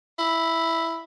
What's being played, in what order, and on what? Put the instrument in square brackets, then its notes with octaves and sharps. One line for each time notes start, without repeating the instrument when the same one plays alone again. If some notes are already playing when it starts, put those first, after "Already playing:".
[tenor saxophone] E4